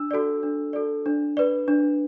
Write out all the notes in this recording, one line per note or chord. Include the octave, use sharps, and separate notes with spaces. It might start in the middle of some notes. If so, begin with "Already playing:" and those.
Already playing: D4 E6
F#4 A4 D5
D4
F#4 A4 D5
D4
B4 D5
D4